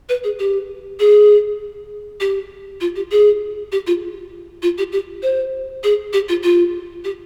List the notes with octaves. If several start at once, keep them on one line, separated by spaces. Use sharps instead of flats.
B4
G#4
G4
G#4
G4
F4
G4
G#4
G4
F4
F4
G4
G4
C5
G#4
G4
F4
F4
G4